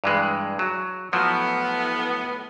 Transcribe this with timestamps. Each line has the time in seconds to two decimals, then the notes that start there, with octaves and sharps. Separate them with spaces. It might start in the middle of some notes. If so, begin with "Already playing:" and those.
0.04 G2 E3 G#3
0.59 F#3
1.13 A2 F3 F#3 B3